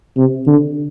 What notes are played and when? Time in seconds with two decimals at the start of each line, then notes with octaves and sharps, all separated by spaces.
0.17 C3
0.47 D3